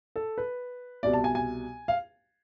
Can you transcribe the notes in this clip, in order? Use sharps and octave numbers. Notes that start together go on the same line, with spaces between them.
A4
B4
C2 B2 D5
A5
G#5
G#5
F5